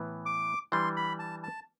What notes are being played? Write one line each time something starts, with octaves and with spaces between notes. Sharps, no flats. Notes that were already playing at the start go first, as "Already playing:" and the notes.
Already playing: A2 E3 B3
D6
E3 G3 D4 C6
B5
A5
A5